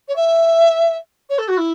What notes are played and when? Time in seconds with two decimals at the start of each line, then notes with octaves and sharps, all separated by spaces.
0.08 C#5
0.16 E5
1.29 C#5
1.38 A4
1.48 F#4
1.57 E4